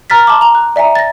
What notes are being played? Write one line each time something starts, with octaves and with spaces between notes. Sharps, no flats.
A#5 F6 A6 B6
A5 C6 D6
A#5 F7
F#6
D5 E5 G#5 A#5
A6 A#6